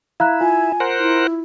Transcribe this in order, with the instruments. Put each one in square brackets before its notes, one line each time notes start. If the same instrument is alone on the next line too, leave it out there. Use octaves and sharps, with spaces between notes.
[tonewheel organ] E4 [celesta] F5 A#5 F#6
[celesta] F4 [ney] G#5
[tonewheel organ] A#4 C5 F#5
[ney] E4